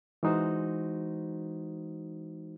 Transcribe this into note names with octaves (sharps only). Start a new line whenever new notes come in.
E3 G#3 D#4 F#4 C5